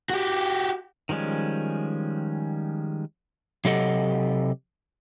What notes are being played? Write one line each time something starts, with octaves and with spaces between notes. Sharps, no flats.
F#4 G4
D#3 F3 G3 G#3 C#4
C3 F#3 G4 A4 D#5 F#5